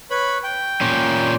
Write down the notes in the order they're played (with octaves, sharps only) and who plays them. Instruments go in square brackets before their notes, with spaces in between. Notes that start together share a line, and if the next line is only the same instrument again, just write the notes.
[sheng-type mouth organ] B4 C#5 B5
G5
[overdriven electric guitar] A#2 C#4